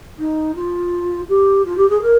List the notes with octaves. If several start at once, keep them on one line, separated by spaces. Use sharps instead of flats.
D#4
F4
G4
F4
G4
G#4
A#4